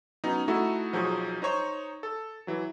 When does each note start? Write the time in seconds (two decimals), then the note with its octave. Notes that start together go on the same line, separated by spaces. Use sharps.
0.24 F#3 B3 C#4 D#4
0.48 A3 D#4 E4 F#4 A4
0.93 B1 F3 F#3 D#4 G#4 C#6
1.42 D#4 C5 C#5 C#6
2.03 A4
2.47 E3 F#3